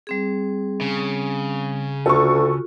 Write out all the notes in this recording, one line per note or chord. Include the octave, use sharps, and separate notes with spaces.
G3 C4 G#4
C#3
D2 F4 F#4 A4 C#6